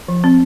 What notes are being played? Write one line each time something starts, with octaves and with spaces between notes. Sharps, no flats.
F3
C4